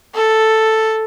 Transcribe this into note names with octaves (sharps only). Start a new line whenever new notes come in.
A4